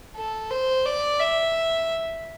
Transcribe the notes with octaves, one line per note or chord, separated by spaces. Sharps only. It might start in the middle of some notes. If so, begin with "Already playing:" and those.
A4
C5
D5
E5